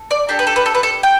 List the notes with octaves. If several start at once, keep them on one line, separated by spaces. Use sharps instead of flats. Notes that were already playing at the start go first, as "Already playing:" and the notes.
Already playing: A4
D5
D4 G4 A4
B4
A4
B4
A4
B4
A4
G5